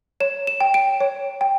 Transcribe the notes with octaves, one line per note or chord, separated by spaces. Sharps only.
C#5 E7
E7
G5
D7
C#5
G5